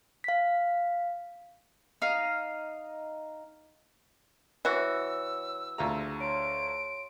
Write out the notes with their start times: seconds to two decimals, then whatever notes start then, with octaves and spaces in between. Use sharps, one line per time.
0.24 F5 B6
2.02 D#4 F5
4.65 E3 F#4 C#5 E6
5.78 D2 F4 G#4 A#5
6.21 C#5 C6 D7